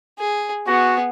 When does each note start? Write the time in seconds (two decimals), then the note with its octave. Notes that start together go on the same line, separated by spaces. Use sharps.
0.19 G#4
0.67 B3 F#4 G#4